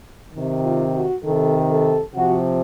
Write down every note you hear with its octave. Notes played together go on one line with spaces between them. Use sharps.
C3 D#3
F4
F#4
C3 D#3 A4
A4
C3 F3 F#4